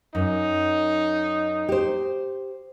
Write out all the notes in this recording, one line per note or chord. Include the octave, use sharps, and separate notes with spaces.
F#2 D#4
G4 C5